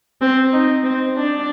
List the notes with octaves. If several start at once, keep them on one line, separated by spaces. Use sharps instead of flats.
C4
D#4
C4
D4